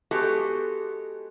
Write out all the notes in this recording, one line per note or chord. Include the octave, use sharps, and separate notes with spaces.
G#3 B3 F#4 G4 A4